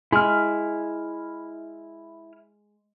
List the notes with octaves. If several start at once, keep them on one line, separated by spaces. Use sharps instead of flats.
G#3 E4 F6